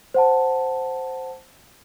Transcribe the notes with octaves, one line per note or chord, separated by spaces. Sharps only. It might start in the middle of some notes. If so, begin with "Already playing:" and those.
C5 F#5 A5